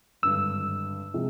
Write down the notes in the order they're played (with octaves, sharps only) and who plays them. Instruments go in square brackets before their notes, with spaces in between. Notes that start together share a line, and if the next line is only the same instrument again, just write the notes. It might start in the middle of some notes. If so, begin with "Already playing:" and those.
[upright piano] G#1 G2 D3 [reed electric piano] E6
[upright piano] C3 F3 G#3